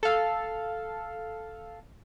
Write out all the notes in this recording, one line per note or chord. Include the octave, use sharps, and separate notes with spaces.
A4 F5